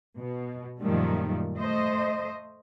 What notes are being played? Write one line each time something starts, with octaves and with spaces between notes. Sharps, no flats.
B2
F#2 A#2 D#3 F3 G3 A3
A3 C5 D#5